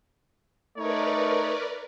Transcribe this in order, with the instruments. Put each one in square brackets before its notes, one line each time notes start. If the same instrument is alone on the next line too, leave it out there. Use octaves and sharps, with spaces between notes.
[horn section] A3 D#4 C#5 [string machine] A#4 B4 D5